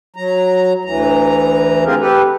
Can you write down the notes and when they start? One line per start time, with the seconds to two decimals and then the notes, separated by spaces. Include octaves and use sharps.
0.16 F#3 A#5
0.85 D2 E3 A#5
1.85 C4 F4 G4 G#4 A#4
2.00 G4 A4 B4